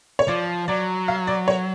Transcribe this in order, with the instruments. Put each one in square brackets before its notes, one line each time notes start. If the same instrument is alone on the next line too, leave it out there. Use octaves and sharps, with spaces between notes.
[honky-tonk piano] C#5
[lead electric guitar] F3 [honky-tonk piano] D5
[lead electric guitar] F#3 [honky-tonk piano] D5
[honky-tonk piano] F5
D5
C#5